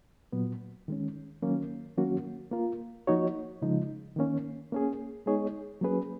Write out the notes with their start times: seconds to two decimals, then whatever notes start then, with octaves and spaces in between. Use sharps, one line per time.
0.32 A#2 F#3 B3
0.88 D#3 G#3 C#4
1.42 D#3 F#3 A#3 C#4
1.97 D#3 F#3 A#3 C#4 F#4
2.52 A#3 F4 A#4
3.07 F3 A#3 D#4 F#4 C#5
3.62 C#3 F3 G#3 D#4
4.16 D#3 A#3 C#4
4.72 A#3 C#4 G#4
5.26 G#3 B3 D#4 G#4 C#5
5.81 F#3 A#3 C#4 G#4 B4